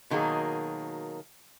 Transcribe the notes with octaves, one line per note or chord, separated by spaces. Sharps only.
B2 D#3 F#3 A#3 G#4